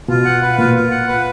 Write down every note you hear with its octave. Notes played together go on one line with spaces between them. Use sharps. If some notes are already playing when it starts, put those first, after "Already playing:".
B2 F4
F#5
B4
A#2 F4
F4
F#5
B4